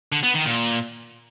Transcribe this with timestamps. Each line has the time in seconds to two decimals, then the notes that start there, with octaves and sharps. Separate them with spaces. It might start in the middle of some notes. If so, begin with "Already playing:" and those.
0.12 D3
0.23 B3
0.35 D#3
0.46 A#2